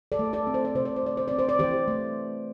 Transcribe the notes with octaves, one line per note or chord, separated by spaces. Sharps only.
A4 D5
A3
A4 D5
C4
C5
D5
C3 C5
D5
C5
A3 D5
C5
C4 D5
C5
D5
E3 G4 C5
A3